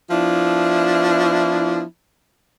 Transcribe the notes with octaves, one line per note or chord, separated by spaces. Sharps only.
F3 B3 D4 E4